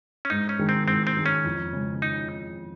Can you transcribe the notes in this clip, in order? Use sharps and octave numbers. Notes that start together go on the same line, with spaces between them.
C#4
G#2 D#4
C#4
D#3 G#3
C4
G#2 C4
C4
D#3 G#3
C#4
F2
C#3 G#3
D#4